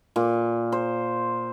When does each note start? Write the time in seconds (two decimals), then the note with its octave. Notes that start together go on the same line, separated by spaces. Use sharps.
0.16 A#2
0.72 C5